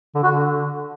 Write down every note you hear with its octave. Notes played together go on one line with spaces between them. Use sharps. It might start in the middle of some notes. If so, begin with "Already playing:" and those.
D3
F#4
D3